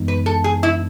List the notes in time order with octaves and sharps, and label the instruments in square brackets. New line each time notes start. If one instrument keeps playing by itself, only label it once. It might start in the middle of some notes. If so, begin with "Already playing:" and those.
Already playing: [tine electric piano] F#2 E3 G#3 B3 D#4
[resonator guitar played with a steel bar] B4
A4
G#4
E4